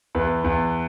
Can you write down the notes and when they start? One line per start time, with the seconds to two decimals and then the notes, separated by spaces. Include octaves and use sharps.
0.15 E2 B4
0.44 E2